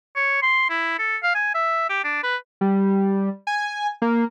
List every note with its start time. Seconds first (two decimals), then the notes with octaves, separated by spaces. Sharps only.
0.16 C#5
0.43 C6
0.70 E4
0.99 A4
1.23 F5
1.35 G#5
1.55 E5
1.89 G4
2.04 D4
2.24 B4
2.61 G3
3.47 G#5
4.02 A#3